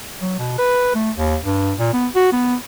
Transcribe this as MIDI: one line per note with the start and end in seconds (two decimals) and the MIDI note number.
0.21 0.35 54
0.39 0.58 47
0.58 0.90 71
0.95 1.11 57
1.18 1.36 39
1.44 1.74 43
1.79 1.90 46
1.94 2.07 59
2.15 2.29 66
2.32 2.55 59